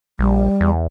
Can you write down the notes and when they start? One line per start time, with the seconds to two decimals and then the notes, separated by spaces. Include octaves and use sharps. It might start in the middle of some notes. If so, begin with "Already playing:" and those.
0.19 A#1 G3
0.61 E2